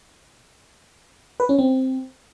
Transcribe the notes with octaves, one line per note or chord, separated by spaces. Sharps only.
B4
C#4
C4